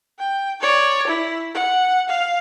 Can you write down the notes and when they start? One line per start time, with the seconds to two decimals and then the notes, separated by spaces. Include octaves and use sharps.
0.19 G5
0.61 C#5 D5
1.08 E4
1.55 F#5
2.09 F5